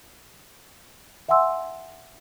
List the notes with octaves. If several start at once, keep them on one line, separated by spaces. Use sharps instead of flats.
E5 F#5 G#5 C6 E6